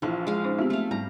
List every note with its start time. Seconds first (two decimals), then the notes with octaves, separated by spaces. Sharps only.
0.02 A#1 E3 F3
0.27 G#3 F5
0.44 C#4 D#4 C5
0.58 B3 C4 E4 F4 G4
0.70 A3 F5
0.91 G#2 G3 A#5